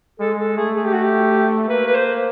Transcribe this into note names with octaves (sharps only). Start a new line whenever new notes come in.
G#3 A4
A4
A3 G#4
G#4
G4
F#4
G4
A#3 B4
B4
C5